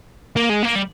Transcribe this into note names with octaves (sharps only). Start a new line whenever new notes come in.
A#3
G#3
A#3
G3